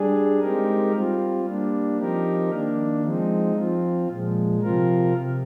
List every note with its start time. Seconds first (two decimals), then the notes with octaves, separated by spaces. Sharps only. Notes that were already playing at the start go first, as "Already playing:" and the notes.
Already playing: G3 D4 G#4
0.40 G#3 C4 D#4 G4 A#4
0.92 G3 C4 F4
1.44 G3 A#3 D4
1.98 F3 C4 D#4 G4 A#4
2.50 D#3 A#3 D4
3.03 F3 G#3 C4 D#4
3.55 F3 C4 F4
4.08 A#2 F3 G#3
4.61 C3 F3 C4 F4 A#4
5.14 C3